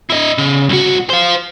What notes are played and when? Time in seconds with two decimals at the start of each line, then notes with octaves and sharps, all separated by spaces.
0.10 E4 D#5
0.38 C#3
0.69 C2 F#4
1.10 C5 F5